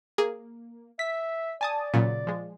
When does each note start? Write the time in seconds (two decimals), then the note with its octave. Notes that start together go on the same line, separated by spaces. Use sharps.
0.18 A#3 G#4
0.99 E5 B6
1.61 D5 G#5 A5 D#6
1.94 A#2 C#3 F#3
2.27 F3 G#3